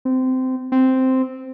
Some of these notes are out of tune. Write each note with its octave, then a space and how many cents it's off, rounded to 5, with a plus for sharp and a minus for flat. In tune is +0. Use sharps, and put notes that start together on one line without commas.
C4 -20
C4 -5